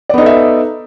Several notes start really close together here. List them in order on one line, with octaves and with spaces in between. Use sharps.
D5 B3 D#4 A4 E5